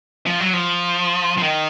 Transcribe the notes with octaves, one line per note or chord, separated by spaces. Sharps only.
F3
F#3
F3
F3
D#3